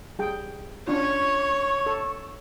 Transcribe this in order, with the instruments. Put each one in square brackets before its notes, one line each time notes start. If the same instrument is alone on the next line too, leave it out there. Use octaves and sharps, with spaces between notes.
[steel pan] G3 G#4 G5
[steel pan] C#4 D4 F4 [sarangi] C#5 [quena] C#6
[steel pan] A4